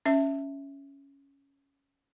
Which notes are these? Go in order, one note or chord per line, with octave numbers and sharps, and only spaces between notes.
C#4 E5